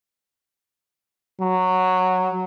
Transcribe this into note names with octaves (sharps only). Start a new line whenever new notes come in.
F#3